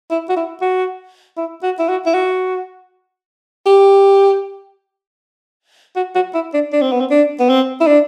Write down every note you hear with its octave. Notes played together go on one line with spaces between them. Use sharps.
E4
F#4
E4
F#4
E4
F#4
E4
F#4
E4
F#4
G4
F#4
F#4
E4
D4
D4
C4
B3
C4
D4
B3
C4
E4
D4